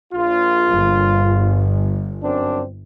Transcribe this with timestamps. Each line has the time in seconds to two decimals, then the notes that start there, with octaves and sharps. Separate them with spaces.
0.13 A#1 F4
0.69 G1
2.23 F#2 C4 D4